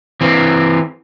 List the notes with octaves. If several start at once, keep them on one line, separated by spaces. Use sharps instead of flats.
E3 C4